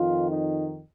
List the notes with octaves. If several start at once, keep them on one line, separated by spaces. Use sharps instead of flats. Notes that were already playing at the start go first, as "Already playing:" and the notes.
Already playing: F2 D#3 F4
D#4